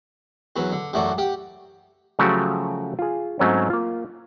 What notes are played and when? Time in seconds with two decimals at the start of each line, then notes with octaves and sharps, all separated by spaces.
0.56 E2 F#3 B4
0.72 D3
0.93 A1 F#2 A3 F#4 D5
1.18 G4 F#5 G5
2.19 C#3 F3 F#3 A3 F#4 G4
2.99 F4 G#4
3.39 G#2 F#3 A3 C4 C#4
3.70 A#3 F4